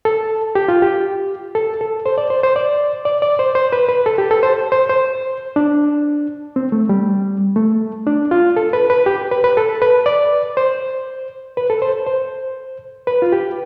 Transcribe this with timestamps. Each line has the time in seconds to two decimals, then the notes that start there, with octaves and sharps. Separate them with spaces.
0.05 A4
0.55 G4
0.68 F4
0.82 G4
1.55 A4
1.81 A4
2.06 C5
2.18 D5
2.30 C5
2.43 C5
2.56 D5
3.05 D5
3.22 D5
3.39 C5
3.55 C5
3.73 B4
3.89 B4
4.06 A4
4.18 G4
4.31 A4
4.43 C5
4.72 C5
4.89 C5
5.56 D4
6.56 C4
6.72 A3
6.89 G3
7.56 A3
8.07 D4
8.31 F4
8.57 A4
8.73 B4
8.90 B4
9.06 G4
9.31 B4
9.44 B4
9.57 A4
9.82 B4
10.06 D5
10.57 C5
11.57 B4
11.70 A4
11.82 C5
12.06 C5
13.07 B4
13.22 F4
13.32 G4